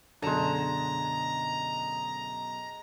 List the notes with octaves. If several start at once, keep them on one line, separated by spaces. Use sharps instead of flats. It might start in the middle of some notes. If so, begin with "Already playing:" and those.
F#2 B2 D3 G#3 A5 A#5